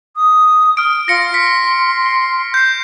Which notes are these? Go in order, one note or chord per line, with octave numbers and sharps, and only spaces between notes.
D#6
F6 D7
F4 A#6 C#7
C6 B6
G6 C7